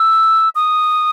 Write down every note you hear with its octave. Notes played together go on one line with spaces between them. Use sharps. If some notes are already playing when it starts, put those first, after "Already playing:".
Already playing: E6
D#6